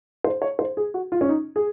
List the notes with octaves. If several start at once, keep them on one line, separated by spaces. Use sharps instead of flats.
C5
C#5
C5
G#4
F#4
F4
C#4
D#4
G#4